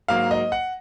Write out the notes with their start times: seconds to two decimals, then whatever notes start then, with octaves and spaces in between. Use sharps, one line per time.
0.08 G#2 F#3 A#3 F5
0.31 D#5
0.52 F#5